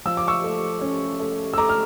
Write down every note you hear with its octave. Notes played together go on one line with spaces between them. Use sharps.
F3 E6
D6
C#6 E6
A3
C#4
A3
E6
A3 A#5 D6
F6